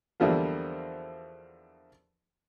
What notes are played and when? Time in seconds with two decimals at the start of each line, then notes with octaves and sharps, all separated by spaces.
0.20 E2 D3 F3 G3 A#3